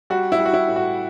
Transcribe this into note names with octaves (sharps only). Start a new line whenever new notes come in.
G3 F#4
E4
G3
F#4
E4
A2
F#4